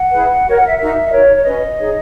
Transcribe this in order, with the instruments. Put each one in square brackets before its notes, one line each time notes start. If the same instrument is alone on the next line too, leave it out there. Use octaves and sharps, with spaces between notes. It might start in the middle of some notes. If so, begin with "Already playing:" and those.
Already playing: [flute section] F#5
E4 G#4 B4
F#4 A#4 C#5
F#5
E5
D#4 F#4 A#4 E5
D#5
D#4 F#4 A#4 C#5
C#5
C#4 F#4 B4 D#5
D#4 G#4 C#5